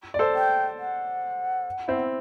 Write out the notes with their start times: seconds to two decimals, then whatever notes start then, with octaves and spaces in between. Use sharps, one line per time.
0.14 D5
0.19 A4 C5
0.35 G5
0.78 F#5
1.88 C4 E4